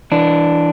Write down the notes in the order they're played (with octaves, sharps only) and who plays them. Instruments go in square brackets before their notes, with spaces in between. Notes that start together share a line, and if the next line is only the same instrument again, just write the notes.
[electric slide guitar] E3 D4